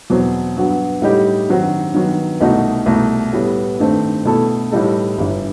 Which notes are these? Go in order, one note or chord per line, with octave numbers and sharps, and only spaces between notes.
E2 B2 F#3 C4
G2 F#3 B3 F#4
A2 G3 D#4 G4
G2 D#3 F#3 C4 F#4
G2 D#3 F#3 B3
C2 B2 A3 D#4 F#4
C2 B2 A3
A2 G3 B3
G2 D#3 A3 C4
B2 A3 E4 A4
A2 E3 G3 D#4 A4
G1 G2 E3